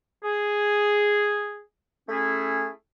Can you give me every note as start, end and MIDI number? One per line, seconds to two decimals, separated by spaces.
0.24 1.61 68
2.09 2.69 57
2.09 2.69 61
2.09 2.69 64
2.09 2.69 68